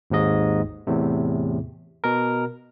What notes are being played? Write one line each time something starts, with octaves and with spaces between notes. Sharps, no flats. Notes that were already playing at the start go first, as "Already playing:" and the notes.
G#1 D#2 G#2 D#5
E2 A2 C3
B2 A#4